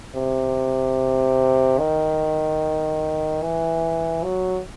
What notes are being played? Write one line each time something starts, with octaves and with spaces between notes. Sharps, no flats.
C3
D#3
E3
F#3